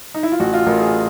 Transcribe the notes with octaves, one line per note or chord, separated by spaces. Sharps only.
D#4
E4
F4
A1 F#4
F4
A1 A#4
G#4